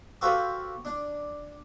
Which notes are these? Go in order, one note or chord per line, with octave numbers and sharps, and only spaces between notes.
F#4 G4 A4 B4 C5 F5
D4